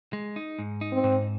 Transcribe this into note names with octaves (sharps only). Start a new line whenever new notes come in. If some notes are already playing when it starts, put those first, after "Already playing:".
G#3
D#4
G#2
D#4
C4
G#2